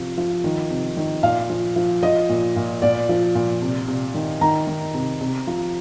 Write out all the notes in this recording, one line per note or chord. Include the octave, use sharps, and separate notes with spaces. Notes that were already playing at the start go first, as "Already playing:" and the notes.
Already playing: C3 F3
F3
D#3
C3
D#3
A#2 F5
F3
F3
F3 D#5
A#2
A#2
A#2 D5
F3
A#2
C3
C3
D#3
D#3 A#5
D#3
C3
C3
F3